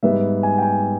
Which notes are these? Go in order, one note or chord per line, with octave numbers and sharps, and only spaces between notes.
G#2 G3 B3 E5
G#5
G5
G#5